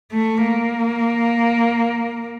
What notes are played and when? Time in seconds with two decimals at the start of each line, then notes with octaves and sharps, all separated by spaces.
0.12 A3
0.46 A#3